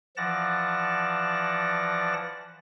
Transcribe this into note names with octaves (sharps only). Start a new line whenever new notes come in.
E3 F3 D5 F#5 A5 A#6